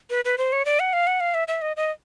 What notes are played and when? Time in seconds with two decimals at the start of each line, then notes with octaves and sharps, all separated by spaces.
0.10 B4
0.25 B4
0.38 C5
0.52 C#5
0.65 D5
0.80 F#5
0.93 F5
1.07 F#5
1.20 F5
1.34 E5
1.48 E5
1.62 D#5
1.77 D#5